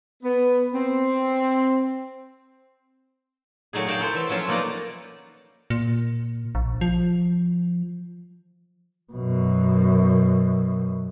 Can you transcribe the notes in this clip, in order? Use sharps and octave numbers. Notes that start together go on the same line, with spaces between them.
B3
C4
A#2 F#3 A3 D#4 G#4
G#4 A#4 F5 G5 A5
F#3 E4 A4 C5
E3 E5
F3 F#3 C#4 F4 E5
A#3 D#4 A4 B4 D5 A#5
A#2
A#1
F3
F#2 B2